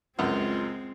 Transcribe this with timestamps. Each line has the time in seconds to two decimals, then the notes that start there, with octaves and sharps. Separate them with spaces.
0.19 C#2 F#2 G#3 C4 F4